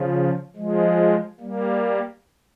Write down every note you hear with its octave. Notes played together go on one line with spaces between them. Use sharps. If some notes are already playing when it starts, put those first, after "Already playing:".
Already playing: C#3 F3
F3 G#3
G3 A#3